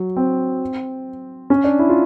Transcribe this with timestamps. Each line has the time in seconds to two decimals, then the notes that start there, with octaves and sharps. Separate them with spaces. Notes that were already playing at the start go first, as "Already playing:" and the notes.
Already playing: F#3
0.17 C4
1.50 C#4
1.64 D4
1.79 E4
1.89 F4